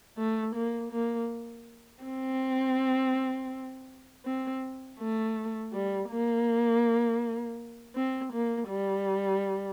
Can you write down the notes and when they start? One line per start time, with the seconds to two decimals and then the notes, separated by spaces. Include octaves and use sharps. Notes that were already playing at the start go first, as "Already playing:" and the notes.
0.18 A3
0.55 A#3
0.92 A#3
2.03 C4
4.25 C4
4.99 A3
5.73 G3
6.10 A#3
7.95 C4
8.33 A#3
8.69 G3